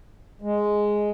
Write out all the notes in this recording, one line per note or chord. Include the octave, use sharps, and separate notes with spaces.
G#3